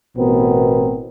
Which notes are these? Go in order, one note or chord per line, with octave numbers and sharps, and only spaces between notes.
A1 B2 B3 C4 A#4